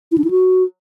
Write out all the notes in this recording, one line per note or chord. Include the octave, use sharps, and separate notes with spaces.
E4
D4
E4
F#4